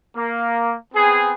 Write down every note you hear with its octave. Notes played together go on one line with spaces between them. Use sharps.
A#3
B3 C4 G#4